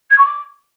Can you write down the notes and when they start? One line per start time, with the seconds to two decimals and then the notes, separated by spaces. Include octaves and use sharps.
0.10 G#6
0.18 C#6
0.25 D6